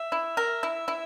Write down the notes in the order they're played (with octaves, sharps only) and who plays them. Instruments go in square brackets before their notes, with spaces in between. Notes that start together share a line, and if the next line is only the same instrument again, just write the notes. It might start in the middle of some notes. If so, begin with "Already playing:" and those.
Already playing: [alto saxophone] E5
[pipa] E4
A#4
E4
E4